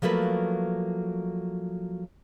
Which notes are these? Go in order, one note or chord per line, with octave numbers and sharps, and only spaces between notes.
F3 F#3 A3 A#3 B4